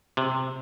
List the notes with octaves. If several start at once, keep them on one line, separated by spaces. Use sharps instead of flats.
C3